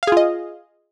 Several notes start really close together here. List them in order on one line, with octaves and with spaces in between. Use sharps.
F5 G#4 F4 D#5